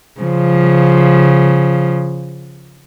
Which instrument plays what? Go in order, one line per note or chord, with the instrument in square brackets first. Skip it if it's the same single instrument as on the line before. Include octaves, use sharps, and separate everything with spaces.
[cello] C#3 F3